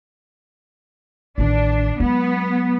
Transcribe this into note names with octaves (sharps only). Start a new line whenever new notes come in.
A1 D#3 D4
F#3 G#3 B3